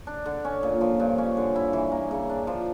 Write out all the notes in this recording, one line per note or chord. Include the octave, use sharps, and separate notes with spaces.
D4
D3
C#4
A#2
F3
G2
C#4
D3
E4
E3
A#3
C#3
D4
F3